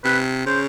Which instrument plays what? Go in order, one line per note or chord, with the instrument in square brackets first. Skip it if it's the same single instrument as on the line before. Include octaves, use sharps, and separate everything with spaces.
[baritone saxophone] C3 [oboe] B4
[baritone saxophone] C#3 [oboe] C5